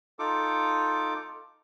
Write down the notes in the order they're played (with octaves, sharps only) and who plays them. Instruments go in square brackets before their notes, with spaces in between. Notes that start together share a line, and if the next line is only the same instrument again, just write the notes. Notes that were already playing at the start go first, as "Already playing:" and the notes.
[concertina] D#4 F4 A4 D6